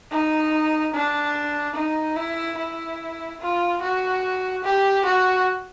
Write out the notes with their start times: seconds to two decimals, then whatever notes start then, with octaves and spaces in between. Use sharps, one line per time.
0.11 D#4
0.93 D4
1.76 D#4
2.16 E4
2.58 E4
3.40 F4
3.81 F#4
4.64 G4
5.05 F#4